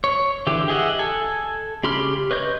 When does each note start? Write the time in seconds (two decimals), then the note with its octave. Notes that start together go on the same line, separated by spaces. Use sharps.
0.04 C#5
0.47 D3 E3 G4
0.68 G4 G#4 D#5 E5 F#5
0.99 A4 G#5
1.84 C#3 G4 B5 C6 F6
2.31 B4 C#5 D#5 G6